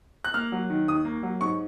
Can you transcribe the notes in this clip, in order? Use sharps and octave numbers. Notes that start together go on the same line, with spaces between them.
F#6
A#3 F6
F#3
D#3
D#2 D#6
A#3
F#3
G#2 C#6